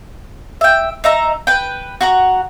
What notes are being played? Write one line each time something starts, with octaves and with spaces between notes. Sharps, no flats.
E5 G5
D#4 E5 A#5
B4 G5
F#4 F#5 A#5